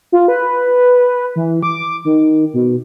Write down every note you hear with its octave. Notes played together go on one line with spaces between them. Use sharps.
F4
B4
E3
D6
D#3
B2